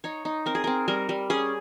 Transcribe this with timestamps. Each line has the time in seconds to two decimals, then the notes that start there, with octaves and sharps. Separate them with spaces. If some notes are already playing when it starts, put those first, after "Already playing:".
0.04 D#4 C#5
0.25 D#4
0.46 C4 A#4
0.55 G#4
0.64 C4 A#4
0.88 G3 A#4
1.09 G3
1.30 C#4 G#4